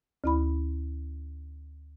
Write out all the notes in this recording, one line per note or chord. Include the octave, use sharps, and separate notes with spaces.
D2 E4 B5